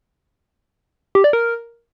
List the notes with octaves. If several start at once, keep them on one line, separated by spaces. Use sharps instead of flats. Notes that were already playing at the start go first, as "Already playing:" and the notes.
G4
D5
A#4